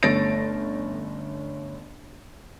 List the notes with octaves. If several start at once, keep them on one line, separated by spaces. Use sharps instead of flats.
G1 A3 C#4 A6 A#6 D7